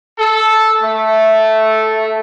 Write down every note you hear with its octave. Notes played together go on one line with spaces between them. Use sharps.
A4
A3